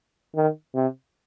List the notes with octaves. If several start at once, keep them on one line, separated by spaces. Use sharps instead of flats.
D#3
C3